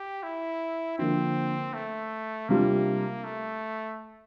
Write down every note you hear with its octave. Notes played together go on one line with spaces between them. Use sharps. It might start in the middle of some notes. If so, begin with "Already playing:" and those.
Already playing: G4
E4
D3 F3 A#3 C4 D4
A3
C3 G3 A#3 D4 F4
A3